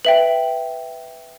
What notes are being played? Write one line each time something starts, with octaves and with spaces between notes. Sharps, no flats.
B4 E5 G5 F#7